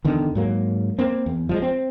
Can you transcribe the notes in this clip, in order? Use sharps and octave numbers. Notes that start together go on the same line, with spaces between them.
E2 D3 D#3
G#2 F#3 A#3
A#3 C4
E2
F3 G3 G#3
C4